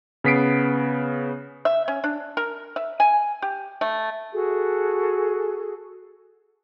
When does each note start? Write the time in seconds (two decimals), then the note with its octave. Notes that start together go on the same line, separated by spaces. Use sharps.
0.24 C#3 B3 B6 C7 D7
1.65 E5
1.88 C#4
2.04 D4
2.37 A#4
2.76 E5
3.00 G#5
3.42 G4
3.81 A3
4.32 F#4 G#4 A4